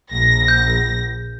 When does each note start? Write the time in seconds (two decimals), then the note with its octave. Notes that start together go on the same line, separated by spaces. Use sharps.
0.11 A#1 A#6
0.48 G6